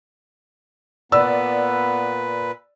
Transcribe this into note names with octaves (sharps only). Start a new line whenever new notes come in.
A#2 B3 B4 D5 E6